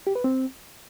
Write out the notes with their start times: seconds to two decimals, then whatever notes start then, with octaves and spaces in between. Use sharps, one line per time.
0.07 G4
0.15 B4
0.24 C4